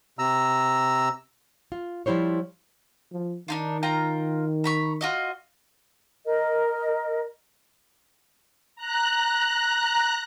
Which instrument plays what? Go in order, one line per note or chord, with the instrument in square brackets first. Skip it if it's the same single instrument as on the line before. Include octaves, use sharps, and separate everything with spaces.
[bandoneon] C3 A#5 E6
[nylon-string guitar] F4
F3 G3 E4 C5 C#5
[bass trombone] F3
[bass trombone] D#3 [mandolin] D4 D#4 F4
[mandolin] F4 G5 A#5
A#5 B5 C#6
F4 F#4 D#5
[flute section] A#4 D#5
[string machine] A#5 F#6